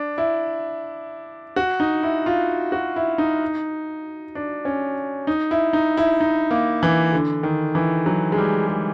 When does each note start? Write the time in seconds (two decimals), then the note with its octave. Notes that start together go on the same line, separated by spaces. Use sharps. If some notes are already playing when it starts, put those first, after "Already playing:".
Already playing: D4
0.18 E4
1.56 F#4
1.80 D#4
2.03 E4
2.26 F4
2.72 F#4
2.96 E4
3.18 D#4
4.35 D4
4.65 C#4
5.27 D#4
5.51 E4
5.73 D#4
5.97 E4
6.21 D#4
6.51 A#3
6.83 E3
7.13 D3
7.43 D#3
7.75 E3
8.06 F#3
8.32 G#3
8.37 G3
8.67 G#3